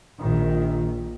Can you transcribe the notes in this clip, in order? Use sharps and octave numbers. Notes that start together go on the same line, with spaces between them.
A#1 D#3